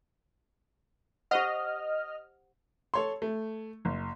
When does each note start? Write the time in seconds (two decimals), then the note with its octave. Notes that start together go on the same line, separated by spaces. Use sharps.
1.31 G4 C5 D#5 F#5 F6
2.94 A4 C#5 C6
3.22 A3
3.85 F#1